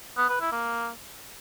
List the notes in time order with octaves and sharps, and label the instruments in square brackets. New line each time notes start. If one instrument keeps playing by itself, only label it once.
[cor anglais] B3
B4
E4
A#3